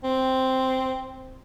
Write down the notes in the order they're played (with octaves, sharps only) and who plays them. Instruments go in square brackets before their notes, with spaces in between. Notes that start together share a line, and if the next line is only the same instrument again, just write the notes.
[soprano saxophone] C4